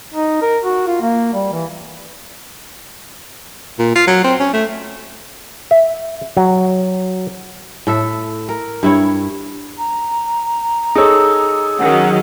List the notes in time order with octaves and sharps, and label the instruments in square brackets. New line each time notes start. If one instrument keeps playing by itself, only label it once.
[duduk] D#4
A#4
F#4
F4
A#3
G3
E3
[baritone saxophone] A#2
F4
F#3
C4
C#4
A3
[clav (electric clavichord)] E5
F#3
[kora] A2 A4 E5
A#4
G2 E4 C#5
[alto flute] A#5
[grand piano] D#4 A4 C#5 [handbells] G#4 E6
[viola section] D#3 F#3 C#4 [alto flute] F#5